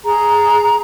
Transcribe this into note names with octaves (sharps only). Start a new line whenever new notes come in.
G#4 A#5